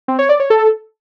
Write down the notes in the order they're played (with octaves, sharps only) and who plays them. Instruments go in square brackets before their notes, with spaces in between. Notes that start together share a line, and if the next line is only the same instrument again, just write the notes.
[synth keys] C4
C#5
D5
C#5
A4